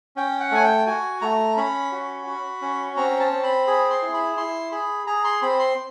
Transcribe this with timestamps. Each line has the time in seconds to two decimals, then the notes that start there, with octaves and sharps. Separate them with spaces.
0.16 C#4 G5
0.40 F#5
0.52 A3 G#5
0.64 G5
0.87 F#4 G#5
1.22 A3 A#5
1.57 C#4 B5
1.92 F#4
2.27 F#4
2.62 C#4
2.97 C4 A#5
3.20 A5
3.32 C4
3.43 B5
3.67 G#4 B5
3.90 C6
4.02 E4
4.14 B5
4.37 E4 C6
4.72 G#4 B5
5.07 G#4 A#5
5.25 C6
5.42 C4 B5
5.59 C6